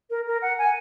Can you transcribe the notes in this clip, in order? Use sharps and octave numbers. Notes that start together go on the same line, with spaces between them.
A#4
A#4
F#5
G#5